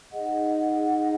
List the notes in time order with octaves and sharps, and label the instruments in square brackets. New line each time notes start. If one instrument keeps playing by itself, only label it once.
[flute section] D#4 G#4 D#5 F#5